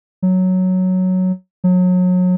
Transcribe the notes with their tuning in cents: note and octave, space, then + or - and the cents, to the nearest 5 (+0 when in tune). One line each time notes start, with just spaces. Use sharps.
F#3 +0
F#3 -30